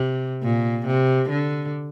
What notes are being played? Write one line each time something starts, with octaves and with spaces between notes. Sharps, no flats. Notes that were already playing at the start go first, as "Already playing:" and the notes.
Already playing: C3
A#2
C3
D3